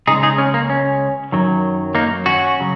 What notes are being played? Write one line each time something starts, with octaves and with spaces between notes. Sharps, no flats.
C#2 C#3 G#3 D#4 G#4
D#4 G#4
C#4
A#3
C#4
F#2 D#3 F#3
A#3 D#4
C#4 F#4
C#3 F#3